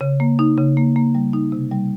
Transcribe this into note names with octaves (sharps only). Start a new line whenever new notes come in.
C#3
A#3
D#4
C#3
A#3
A#3
G3
D#4
C3
G3